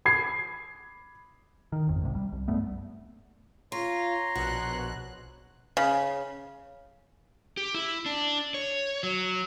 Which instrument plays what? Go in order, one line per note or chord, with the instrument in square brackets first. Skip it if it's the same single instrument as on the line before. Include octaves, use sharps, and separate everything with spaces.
[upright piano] B5 G#6 C7
[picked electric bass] D#3
G#1 F2
C2 G#2 C3
G3
C2
G2 G3 A3 B3
[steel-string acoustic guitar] F4 [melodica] C#5 A#5 C6
[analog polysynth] A#1 B2 F#6 [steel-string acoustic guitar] F#4
[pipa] C#3
[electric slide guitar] G4
E4
D4
C#5
F#3